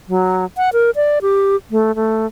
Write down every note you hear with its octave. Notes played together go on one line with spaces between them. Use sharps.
F#3
F#5
A#4
D5
G4
A3
A3